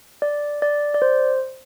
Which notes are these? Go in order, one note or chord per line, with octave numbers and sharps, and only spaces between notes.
D5
D5
D5
C5